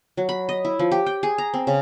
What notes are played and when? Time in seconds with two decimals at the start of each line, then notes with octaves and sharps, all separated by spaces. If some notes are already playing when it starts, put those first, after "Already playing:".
0.17 F#3
0.29 B5
0.49 D#5
0.65 E4
0.79 F3
0.91 G4
1.06 G5
1.23 G#4
1.38 A#5
1.54 C4
1.67 C#3